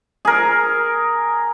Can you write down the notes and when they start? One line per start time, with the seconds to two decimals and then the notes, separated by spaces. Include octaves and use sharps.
0.25 G#4 A#4